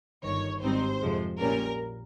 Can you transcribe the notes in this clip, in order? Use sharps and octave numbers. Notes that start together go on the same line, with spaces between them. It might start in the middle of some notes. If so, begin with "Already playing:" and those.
G1 G2 D#3 C#5
G#1 G2 G3 C4 D#4 C5
F2 C3 F3 G#3
A#1 A#2 G3 C#4 A#4